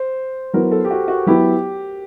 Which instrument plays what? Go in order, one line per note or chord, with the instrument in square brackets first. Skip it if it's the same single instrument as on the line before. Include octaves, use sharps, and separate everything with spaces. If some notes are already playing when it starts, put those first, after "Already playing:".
Already playing: [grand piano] C5
[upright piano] F#3 B3 E4 [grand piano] A#4
[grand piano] A4
G4
F#4
F#4
[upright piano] F#3 B3 E4 [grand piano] G4